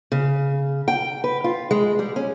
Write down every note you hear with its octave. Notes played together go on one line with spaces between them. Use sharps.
C#3
G5
B4
F4
G#3
G3
C#4